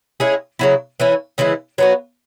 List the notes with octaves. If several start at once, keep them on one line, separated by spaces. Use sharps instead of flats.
G#3 C#4 E4 G#4
C#3 F#3 E4
E3 C#4 E4
C#3 E3 G#3 E4
F#3 B3 F#4